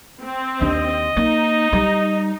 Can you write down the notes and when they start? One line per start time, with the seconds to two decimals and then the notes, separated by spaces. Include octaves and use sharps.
0.22 C4
0.61 D#2 D4 D#5
1.17 A#3 D#4
1.73 G3